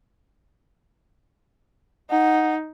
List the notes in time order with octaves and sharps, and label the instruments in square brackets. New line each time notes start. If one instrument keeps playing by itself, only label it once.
[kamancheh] D#4 [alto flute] F#5